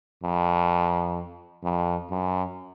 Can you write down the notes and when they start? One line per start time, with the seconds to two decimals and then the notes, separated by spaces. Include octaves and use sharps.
0.23 F2
1.63 F2
2.11 F#2